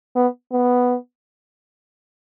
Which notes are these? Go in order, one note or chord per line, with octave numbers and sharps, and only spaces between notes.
B3
B3